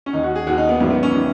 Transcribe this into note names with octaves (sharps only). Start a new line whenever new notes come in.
C#4
D#2 D#3 D#4
F#4
G#4
D#2 D#3 F#4
D#4
B3
G#1 F#2 D#3 B3
B3
C#4
D#3